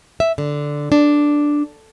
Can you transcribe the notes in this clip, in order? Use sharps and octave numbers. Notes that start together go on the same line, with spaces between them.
E5
D3
D4